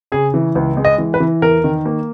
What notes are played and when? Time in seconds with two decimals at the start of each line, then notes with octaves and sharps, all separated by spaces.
0.12 C#3 G#4
0.34 E3
0.55 C#2
0.77 G#3
0.85 D#5
0.98 E3
1.14 B4
1.20 E3
1.42 E2 A#4
1.64 D#3
1.85 A#3